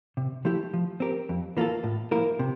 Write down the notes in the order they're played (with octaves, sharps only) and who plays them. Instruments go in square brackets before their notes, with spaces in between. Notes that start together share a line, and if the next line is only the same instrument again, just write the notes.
[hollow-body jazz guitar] C3
F3 A3 E4 G4
F3
C4 G4 A#4
F2
E3 A#3 F4 A4
A2
F3 A#3 E4 A#4
C3